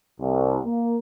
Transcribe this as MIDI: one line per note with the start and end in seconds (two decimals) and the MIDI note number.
0.20 0.58 36
0.65 0.99 58